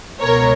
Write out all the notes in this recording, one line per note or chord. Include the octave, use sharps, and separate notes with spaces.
C#2 B2 A#4 C#5